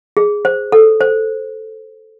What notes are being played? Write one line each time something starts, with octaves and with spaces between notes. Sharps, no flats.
G#4
C5
A4
C5